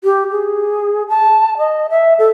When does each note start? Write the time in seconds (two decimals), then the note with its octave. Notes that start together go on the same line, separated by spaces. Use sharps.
0.04 G4
0.31 G#4
1.09 A5
1.58 D#5
1.90 E5
2.19 A4